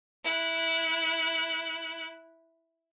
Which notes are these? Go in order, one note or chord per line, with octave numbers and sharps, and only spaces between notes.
E4 F#6